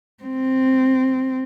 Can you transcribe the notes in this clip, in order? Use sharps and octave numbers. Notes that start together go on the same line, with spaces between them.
C4